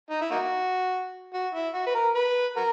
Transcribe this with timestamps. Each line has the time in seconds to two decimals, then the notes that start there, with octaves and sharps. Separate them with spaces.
0.10 D#4
0.21 E4
0.31 A#3 D#4 F#4
1.34 F#4
1.54 E4
1.74 F#4
1.86 B4
1.95 A#4
2.15 B4
2.56 F#4 A#4